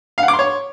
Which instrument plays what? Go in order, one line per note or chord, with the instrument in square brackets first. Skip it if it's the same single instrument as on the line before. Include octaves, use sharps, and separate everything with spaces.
[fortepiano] F5
F#5
D6
C6
C#5